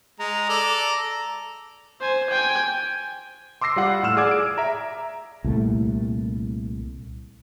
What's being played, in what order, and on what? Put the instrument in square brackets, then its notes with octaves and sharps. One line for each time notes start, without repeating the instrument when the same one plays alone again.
[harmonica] G#3 [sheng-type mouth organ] A#5
[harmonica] A4 D5
[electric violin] C5 G#5
G5 G#5
[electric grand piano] C6 D6 E6 A#6 C7
G3 F4 F#5
A2 F#5 E6 F6 E7
G#4 D5 D6 G#6
D7
E5 A#5
[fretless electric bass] C2 A#2 A3